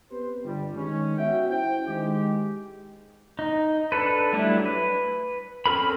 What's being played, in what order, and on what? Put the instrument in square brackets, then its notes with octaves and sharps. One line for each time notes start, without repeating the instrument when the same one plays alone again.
[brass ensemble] B3 C4 G4 B4 C5
G1 G3
D#3 G#3 C#4
B3 F#4 E5 F#5 G5
C#4 E4 C5 G5
D#3 G#3 G4
[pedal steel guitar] D#4
D4 A4 B4
F#3 G3 A3 D4 E4
B4
C4 C#4 A4 A#4 B5